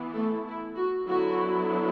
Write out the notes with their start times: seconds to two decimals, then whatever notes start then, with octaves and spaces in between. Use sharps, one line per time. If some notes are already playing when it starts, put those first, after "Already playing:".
Already playing: E3 B3 E4
0.14 A3 A4
0.45 E4
0.76 F#4
1.07 D3 F#3 B3 E4 F#4